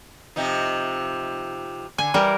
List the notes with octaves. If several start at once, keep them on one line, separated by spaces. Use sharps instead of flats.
C3 F3 D#4
D3 G#5
E3 G3 A#4